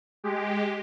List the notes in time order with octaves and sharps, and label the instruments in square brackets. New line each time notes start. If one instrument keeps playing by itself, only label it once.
[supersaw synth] G#3 G4